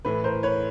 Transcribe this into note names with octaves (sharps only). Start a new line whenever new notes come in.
A2 E3 B4
A#4 C5
B4 C#5